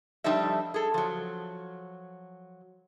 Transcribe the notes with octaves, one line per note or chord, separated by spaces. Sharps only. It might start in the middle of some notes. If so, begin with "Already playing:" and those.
F3 G3 A3 D4 D#4 E5
G#4 A4
F3 F#3